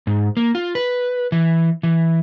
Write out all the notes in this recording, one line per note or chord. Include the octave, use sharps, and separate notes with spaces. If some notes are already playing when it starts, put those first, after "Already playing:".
G#2
A#3
F4
B4
E3
E3